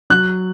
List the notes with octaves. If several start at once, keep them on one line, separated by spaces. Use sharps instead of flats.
F#3 F#6